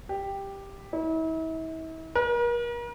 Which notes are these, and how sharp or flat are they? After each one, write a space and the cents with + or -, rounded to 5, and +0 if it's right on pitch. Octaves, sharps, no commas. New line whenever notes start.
G4 +5
E4 -40
A#4 +40